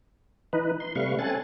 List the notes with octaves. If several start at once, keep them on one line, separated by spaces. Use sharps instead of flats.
E3 D#4 B4
C6
C3 G3 A3 B4 F5 C#6
C4 C#4 A4 G#5 F#6 A6